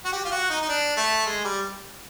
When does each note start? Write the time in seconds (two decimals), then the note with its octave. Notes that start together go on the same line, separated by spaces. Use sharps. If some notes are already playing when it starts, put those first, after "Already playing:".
0.05 F#4
0.12 G4
0.25 F4
0.32 F#4
0.50 D#4
0.62 D#4
0.69 D4
0.97 A3
1.26 G#3
1.45 G3